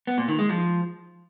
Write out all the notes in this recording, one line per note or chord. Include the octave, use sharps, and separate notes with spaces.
B3
A#2
D#3
G#3
F3